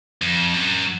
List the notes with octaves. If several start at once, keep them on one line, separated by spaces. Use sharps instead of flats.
F2
F#2